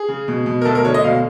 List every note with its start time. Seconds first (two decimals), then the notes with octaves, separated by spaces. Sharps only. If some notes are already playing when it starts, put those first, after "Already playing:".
Already playing: G#4
0.08 C#3
0.28 B2
0.46 B2
0.61 A#4
0.65 D2 A4
0.75 A#4
0.85 D3 C#5
0.94 D#5
1.04 B2 F5